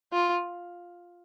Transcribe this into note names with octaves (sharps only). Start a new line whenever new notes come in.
F4